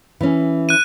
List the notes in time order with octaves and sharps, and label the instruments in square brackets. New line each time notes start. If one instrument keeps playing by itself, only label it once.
[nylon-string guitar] E3 C#4
[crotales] F#6 D#7